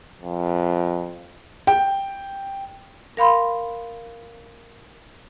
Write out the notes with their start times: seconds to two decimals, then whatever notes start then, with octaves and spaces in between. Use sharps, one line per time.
0.22 F2
1.67 G5
3.17 A#4 F5 B5 C6